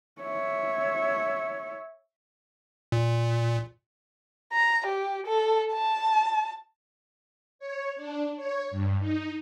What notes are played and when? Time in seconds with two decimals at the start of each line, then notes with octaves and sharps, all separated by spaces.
0.21 C#5 E5
2.92 A#2
4.52 A#5
4.86 G4
5.26 A4
5.72 A5
7.59 C#5
7.96 D4
8.36 C#5
8.71 G2
9.00 D#4